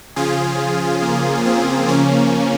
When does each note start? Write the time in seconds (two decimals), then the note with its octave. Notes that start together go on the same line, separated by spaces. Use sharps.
0.16 C#3 F3 F4 G#4
1.02 A#3
1.46 C4
1.88 C#3 F3 A#3 C#4